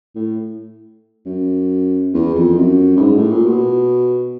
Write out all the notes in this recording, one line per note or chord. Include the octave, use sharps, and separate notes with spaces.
A2
F#2
E2
F2
F#2
G2
G#2
A2
A#2
B2